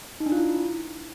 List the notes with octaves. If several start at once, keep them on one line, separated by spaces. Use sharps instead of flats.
D#4
D4
F4
E4